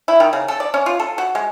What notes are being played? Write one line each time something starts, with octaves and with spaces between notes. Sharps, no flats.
E4
D#3
C#3
A4
D5
C#4
F4
A4
F#4
G#3